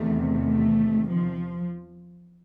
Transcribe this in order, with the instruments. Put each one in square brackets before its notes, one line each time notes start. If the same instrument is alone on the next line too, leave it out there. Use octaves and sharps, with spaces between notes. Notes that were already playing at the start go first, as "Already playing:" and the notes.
Already playing: [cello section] E2 C3 D#3 A3
A3
F3